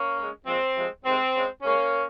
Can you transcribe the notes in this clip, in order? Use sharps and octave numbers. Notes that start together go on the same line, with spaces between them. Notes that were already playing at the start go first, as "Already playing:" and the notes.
Already playing: A#3 C#4
C#3 G#3
A#2 F3 G#3 C4
C3 F3 G#3
C3 D#3 G#3 C4
C#3 G#3
C#3 G#3 A#3 C#4